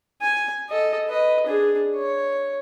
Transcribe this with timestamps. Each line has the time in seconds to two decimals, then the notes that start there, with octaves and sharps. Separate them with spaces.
0.21 G#5
0.69 A4 D#5
1.08 B4 D#5
1.46 D4 G#4
1.95 C#5